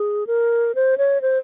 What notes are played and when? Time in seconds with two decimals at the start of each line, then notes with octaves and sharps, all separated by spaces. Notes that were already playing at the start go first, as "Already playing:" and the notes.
Already playing: G#4
0.27 A#4
0.75 C5
0.98 C#5
1.22 C5